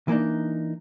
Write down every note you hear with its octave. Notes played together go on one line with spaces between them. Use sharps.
E3 A#3 D4 D#4